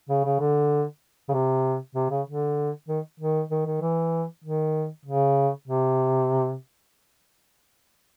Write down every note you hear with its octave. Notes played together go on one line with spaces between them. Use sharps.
C#3
C#3
D3
C#3
C3
C3
C#3
D3
D#3
D#3
D#3
D#3
E3
D#3
C#3
C3